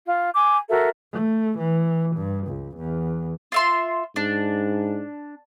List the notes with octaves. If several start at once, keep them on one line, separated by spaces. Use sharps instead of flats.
F4
G#5 D6
F#4 A4 A#4 E5
A3
E3
G2
C#2
E2
F4 E5 C6
G#2 D4